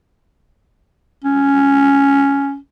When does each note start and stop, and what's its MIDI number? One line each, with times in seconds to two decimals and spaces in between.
1.24 2.57 61